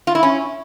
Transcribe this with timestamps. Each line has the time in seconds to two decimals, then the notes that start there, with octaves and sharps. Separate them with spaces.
0.07 F4
0.15 E4
0.23 C#4